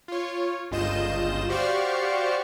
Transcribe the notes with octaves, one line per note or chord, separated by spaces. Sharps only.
F4 C#5
G1 C#2 F4 D#5 G6 E7
F#4 G4 C5 D5 F5 C#6